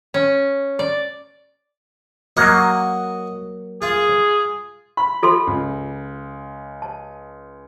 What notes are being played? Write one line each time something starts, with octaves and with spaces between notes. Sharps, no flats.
C#4
D5
F#3 A#3 F#4 D#5
F4 G#4
B5
F4 A4 C6
C#2
A5